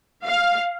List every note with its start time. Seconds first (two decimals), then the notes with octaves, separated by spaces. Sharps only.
0.25 F5